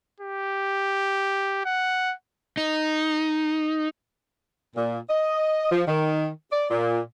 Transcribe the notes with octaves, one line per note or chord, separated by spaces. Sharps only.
G4
F#5
D#4
A#2
D#5
F3
D#3
D5
A#2